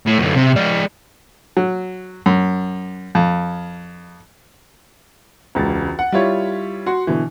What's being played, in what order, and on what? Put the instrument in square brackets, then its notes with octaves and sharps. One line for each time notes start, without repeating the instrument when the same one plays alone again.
[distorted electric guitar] A2
F#2 D3
C3
G#3 D5
[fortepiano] F#3
F#2
F2
[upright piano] E1 C#2 A6
F#5
G3 E4 F4 C#5
F#4 C6
B2 D3 E3